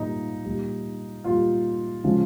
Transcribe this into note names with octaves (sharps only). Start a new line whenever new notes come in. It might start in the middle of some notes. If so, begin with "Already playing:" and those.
Already playing: A#2 G3 D#4
A#2 G3
A#2 G3 F4
C#3 F3 G#3